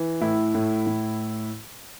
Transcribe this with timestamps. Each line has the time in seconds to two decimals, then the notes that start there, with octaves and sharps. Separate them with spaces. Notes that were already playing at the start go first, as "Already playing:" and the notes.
Already playing: E3
0.21 A2 E4
0.54 A2
0.86 A2